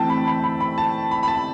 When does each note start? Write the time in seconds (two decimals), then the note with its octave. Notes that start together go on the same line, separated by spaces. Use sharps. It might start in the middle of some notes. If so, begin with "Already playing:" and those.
Already playing: E3 A3 C4 G5 A5
0.10 B5
0.28 B5
0.44 B5
0.60 B5
0.78 A5
1.11 B5
1.23 B5
1.28 A5